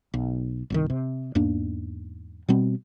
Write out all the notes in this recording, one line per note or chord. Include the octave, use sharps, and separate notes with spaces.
B1
G1 C2 D#3
C3
E2 G#2 A#3 D4
B2 G3 C4